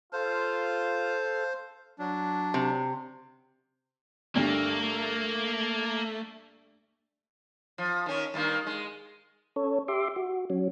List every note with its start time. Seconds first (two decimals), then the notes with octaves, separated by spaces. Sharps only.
0.13 F4 A4 C5 F5
1.98 F#3 D4
2.54 C3
4.35 D2 G2 A3 A#3
7.78 F3
8.06 D#3 C#4
8.34 G2 D#3 A#3
8.67 G#3
9.56 C#4 A4 C#5
9.88 G4 E5 C6 D6
10.16 F#4
10.50 F#3 C#4